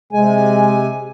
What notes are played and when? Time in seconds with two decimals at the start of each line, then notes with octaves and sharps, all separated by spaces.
0.13 C3 G#3 G#5